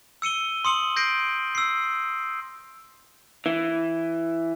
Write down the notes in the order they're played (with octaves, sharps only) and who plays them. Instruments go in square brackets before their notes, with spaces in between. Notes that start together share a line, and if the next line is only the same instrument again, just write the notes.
[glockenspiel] E6 C#7 D#7 G7
C6 D#6 C#7 F#7
G6 A#6 C7 D7
E6 C7
[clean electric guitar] E3